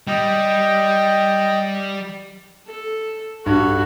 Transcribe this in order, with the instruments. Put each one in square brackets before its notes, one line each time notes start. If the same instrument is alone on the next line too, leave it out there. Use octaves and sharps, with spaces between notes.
[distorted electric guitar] G3 [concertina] D#5 G5
[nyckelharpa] A4
[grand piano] G2 [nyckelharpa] F#4 A4